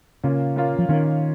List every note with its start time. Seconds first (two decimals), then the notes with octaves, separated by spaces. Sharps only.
0.23 A#2 C#3 A#3 C#4 F4
0.56 A#2 A#3 C#4 F4
0.79 F3
0.89 A#2 D#3 A#3 C#4 F4